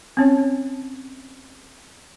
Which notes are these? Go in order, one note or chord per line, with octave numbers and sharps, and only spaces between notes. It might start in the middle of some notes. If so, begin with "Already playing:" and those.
C4 C#4 C#5